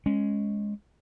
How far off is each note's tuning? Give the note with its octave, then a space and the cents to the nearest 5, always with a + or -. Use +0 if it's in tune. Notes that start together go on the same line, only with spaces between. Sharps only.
G#3 +0 C#4 +0